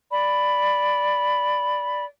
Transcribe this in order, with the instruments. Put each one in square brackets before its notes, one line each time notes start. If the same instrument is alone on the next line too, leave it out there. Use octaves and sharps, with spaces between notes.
[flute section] D5 B5